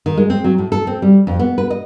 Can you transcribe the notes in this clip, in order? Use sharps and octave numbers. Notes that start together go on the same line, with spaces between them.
D#3
G#3
C4
F#3
A2
A4
C4
G3
F2
B3
B4
D#5